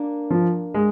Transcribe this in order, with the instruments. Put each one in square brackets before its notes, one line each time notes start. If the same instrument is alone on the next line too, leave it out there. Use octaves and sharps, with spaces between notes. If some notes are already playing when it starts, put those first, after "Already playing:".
Already playing: [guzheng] A#3 D4
[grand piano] F3
G#3